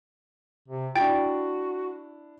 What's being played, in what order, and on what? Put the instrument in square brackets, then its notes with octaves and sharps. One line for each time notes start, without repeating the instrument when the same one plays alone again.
[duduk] C3
[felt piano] D4 E4 [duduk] F#4 [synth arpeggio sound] G5 A6 D7